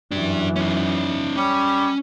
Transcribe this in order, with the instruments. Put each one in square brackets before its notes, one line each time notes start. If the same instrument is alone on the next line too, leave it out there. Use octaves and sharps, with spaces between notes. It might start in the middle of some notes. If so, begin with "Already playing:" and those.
[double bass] F#2 E3 [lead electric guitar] D4 G4
[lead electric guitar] C#4 D#4
[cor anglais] G3 [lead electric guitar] C#4